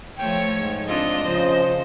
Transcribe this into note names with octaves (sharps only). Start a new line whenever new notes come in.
F3 A3 C#5 G5
G#2
C4 D4 F4 D#5
C#3 F3 C5